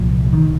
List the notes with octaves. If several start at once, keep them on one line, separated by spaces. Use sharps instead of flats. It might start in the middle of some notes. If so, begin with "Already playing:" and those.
Already playing: C2 A#2 F3
D#3